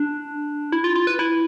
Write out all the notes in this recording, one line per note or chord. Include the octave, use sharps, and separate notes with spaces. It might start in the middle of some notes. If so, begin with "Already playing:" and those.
Already playing: D4
E4
F4
F4
B4
E4